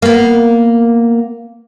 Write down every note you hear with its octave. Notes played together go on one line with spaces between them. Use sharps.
A#3 B3